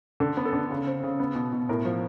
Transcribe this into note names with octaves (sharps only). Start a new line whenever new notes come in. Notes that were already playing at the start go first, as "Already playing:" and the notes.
D3 A4
B3
A4
D3
C#3
C4
C#3
B3
B2
B2
A2 A#4
F3